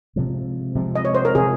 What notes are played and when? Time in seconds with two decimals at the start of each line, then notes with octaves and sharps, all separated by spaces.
0.16 C3 F3 G#3
0.75 C3 F3 G#3
0.95 D#5
1.05 C#5
1.15 C5
1.25 A#4
1.35 C3 F3 G#3 G#4